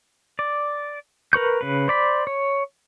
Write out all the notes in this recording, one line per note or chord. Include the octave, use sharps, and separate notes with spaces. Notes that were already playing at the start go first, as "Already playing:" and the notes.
D5
A#4 B4 C#6 G6
C#3 B4
C5 D5 B5
C#5